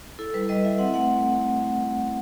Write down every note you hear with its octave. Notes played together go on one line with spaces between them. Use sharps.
E4 A4
G3 B4
G3 D#5
E4 E5
C4 F#5
A3 F#5